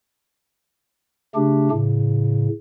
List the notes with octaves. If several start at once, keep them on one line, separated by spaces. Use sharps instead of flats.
C#3 A3 D4 G4
A2 C#3